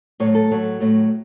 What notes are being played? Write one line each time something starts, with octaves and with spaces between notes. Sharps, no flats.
A2 F#3 A3 C#5
A4
A2 F#3 A3
A2 F#3 A3